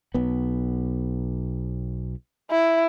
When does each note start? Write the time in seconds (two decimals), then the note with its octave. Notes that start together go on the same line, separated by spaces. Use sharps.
0.14 B1 B3
2.51 E4